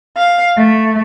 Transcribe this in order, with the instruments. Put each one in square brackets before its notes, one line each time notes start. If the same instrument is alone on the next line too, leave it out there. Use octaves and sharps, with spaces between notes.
[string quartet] F5
A3